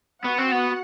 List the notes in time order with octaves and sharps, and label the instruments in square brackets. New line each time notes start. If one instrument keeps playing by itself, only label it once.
[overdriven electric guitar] B3 [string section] F#4 F#5
[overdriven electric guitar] C4
B3